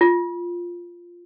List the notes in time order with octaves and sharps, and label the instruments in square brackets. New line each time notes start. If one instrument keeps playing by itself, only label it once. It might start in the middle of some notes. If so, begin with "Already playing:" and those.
[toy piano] F4